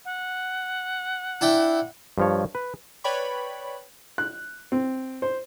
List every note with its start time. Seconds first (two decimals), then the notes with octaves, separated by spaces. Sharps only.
0.05 F#5
1.41 D4 E4 G5
2.18 G2 F3 C#5
2.55 B4
3.04 B4 C#5 D5 G5 B5 C#6
4.18 F#6
4.72 C4
5.22 C5